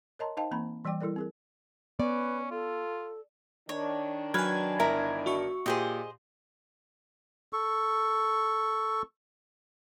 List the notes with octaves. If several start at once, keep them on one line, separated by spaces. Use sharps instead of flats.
A#4 C#5 D#5 A5 A#5 C6
D#4 C5 D#5 F5 G5 A5
E3 A#3 C4 A#5 B5
E3 G3 D5 G5 D6
G3 E4 A4 A#4 D5
C4 G#4 A#4
B3 C#4 B4 D5
F4 A4
D#3 D4 C#5
F#3 B4 G#5 F6 G#6
G1 E4 A#4 A#5 B5
F#4 E5 C#6
A#2 G4 G#4 C5 D#5
A4 C#6